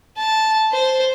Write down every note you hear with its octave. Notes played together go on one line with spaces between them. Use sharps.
A5
C5